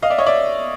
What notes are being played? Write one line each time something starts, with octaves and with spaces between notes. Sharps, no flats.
D#5 F5
D5 E5
C#5 D#5
D5 E5